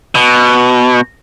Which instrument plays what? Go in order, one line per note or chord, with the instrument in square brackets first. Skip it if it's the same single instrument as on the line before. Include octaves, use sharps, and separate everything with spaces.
[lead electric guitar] B2